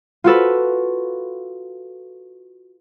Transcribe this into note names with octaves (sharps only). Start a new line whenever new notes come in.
F4 F#4 A4 B4